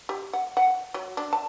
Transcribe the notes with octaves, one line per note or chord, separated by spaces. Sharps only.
G4
F#5
F#5
F#3
D4
A5